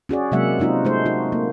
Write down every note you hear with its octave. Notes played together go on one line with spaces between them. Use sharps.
C#4 F#4 G#4 D5
C3 F#3 G#3 A#3 E5 F#5
G#3 C4 D#4 F4 F#4
G#3 A3 C5
D#4 F#4
A#3